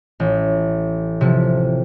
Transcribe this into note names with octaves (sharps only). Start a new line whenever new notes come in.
A1
C3 F3